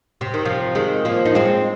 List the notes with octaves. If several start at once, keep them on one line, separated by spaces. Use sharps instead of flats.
C3
D#3
C3 F3
D#3 G#3
F3 A#3
D#4
G#3 C4